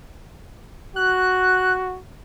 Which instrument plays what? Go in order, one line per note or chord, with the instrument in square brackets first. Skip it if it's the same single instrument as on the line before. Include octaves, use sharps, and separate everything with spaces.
[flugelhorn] F#4 [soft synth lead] F#6